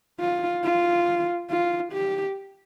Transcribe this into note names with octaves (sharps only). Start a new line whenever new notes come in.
F4
F4
F4
G4